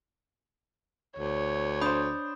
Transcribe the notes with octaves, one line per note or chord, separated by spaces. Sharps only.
D2 C#5
D4 C5 B5 D#6 G6